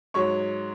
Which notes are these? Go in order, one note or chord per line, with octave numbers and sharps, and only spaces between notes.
G#2 F#3 C#5 C#6